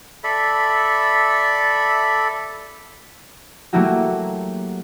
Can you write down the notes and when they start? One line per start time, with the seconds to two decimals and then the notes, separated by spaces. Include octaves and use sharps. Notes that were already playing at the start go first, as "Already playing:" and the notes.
0.24 A4 D5 E5 B5
3.73 F#3 A3 A#3 E4 F#4 G4